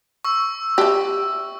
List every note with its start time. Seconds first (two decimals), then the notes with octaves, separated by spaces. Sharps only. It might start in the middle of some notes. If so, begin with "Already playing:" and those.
0.25 C#6 E6
0.78 G4 E5